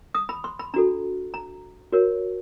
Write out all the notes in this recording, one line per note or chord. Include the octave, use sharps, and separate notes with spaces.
D#6
B5
C6
B5
D4 F#4 A4 A#5
A#5
F#4 A#4 C#5